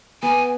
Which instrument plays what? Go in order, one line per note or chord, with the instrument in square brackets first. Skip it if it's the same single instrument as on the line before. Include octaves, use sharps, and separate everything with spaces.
[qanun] B3 [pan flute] G#5